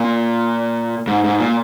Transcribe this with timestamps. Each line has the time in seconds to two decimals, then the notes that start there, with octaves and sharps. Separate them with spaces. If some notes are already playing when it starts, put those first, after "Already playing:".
Already playing: A#2
1.07 G#2
1.24 G#2
1.40 A#2